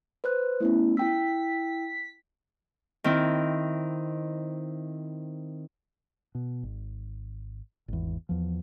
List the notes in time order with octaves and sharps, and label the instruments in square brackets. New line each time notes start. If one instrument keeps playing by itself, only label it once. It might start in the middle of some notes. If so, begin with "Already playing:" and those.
[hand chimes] B4 C5 F#6
[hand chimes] A3 B3 C#4 [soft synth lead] E4
[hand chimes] E4 G5 E6 [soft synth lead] B6
[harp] D#3 C4 E4
[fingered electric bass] B2
G#1
G#1 E2
E2 F3